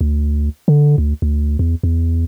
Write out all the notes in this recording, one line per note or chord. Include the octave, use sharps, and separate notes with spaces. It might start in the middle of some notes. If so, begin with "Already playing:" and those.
D2
D3
D2
D2
E2
E2